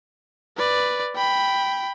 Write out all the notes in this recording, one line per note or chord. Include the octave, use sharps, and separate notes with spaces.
B4 D5
G5 B5